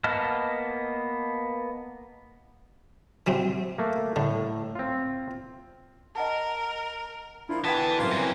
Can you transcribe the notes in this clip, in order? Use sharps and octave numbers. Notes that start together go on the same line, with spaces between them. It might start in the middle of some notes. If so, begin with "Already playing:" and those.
A#3 B3 D#5 A5 F6
E3 F#3 C4
A3 A#3
A2 D3
C4 F4
A#4 D#5 F#5 A5
A#2 F3 D4 E4 F4
B2 D3 E3 B3 G5 A5 G#6 B6
F#1 C2 F#2 A#3 F4
C3 C#4